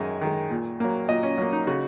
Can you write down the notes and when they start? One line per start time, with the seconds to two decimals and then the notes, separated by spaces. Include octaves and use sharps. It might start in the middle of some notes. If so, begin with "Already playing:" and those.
Already playing: F#2 D#3 G#3 D#5 G#5
0.21 D#3 G#3
0.50 A#2
0.80 F#3 A#3
1.09 A#2 D#5
1.23 C#4
1.38 F#3 A#3 C#4
1.52 D#4
1.67 C#3 F#4